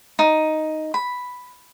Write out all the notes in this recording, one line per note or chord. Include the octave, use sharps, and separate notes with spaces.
D#4
B5